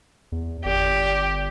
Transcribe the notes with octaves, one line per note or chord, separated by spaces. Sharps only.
E2
G1 G4 D5